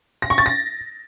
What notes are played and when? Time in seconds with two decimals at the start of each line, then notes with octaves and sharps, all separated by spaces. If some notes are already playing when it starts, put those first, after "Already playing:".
0.22 A#6
0.30 C#6
0.38 A6
0.46 A#6